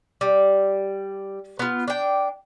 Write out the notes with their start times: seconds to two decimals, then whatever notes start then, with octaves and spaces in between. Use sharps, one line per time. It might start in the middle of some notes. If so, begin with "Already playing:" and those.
0.21 G3
1.59 B3 F4
1.88 D4 G5